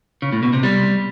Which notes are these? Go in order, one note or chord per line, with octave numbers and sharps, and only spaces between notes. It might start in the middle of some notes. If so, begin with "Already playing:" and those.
C#3
A2
B2
C3
G3